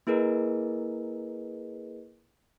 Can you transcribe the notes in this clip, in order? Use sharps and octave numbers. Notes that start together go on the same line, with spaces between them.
A#3 E4 G#4 A#4 B4 D#5